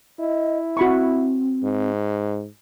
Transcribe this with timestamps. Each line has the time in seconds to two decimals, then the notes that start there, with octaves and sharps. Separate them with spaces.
0.19 E4 D#5
0.77 C4 F#4 B5 C#6
1.63 G#2